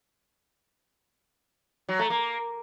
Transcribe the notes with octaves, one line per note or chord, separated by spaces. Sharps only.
F#3
A3
A#3